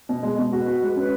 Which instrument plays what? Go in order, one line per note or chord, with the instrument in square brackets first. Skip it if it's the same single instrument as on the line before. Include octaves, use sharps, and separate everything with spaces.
[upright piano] B2
G#3
B2
[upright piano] F#4 [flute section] B4
[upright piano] F#4
G#3
[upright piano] C#4 [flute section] B4